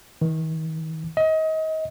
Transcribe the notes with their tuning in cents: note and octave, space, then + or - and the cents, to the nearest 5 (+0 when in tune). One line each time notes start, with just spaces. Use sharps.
D#3 +45
D#5 +30